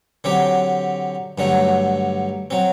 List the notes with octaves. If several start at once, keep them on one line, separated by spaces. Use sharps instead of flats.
D3 F#3 C4 G4
G2 D3 F#3 A3
F#3 C4